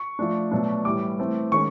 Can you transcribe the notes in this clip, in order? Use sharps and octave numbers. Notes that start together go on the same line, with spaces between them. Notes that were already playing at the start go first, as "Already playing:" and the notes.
Already playing: C#6
F3 A3 D4
B2 F#3 A3 D4
A2 E3 G3 D6
E3 A3 C4
D#3 G#3 C#4 C#6